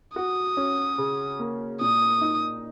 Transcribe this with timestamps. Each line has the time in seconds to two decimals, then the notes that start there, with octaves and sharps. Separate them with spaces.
0.16 F#4 D#6
0.57 C#4
0.98 C#3
1.39 A#3
1.81 A#2 D#6
2.21 D#4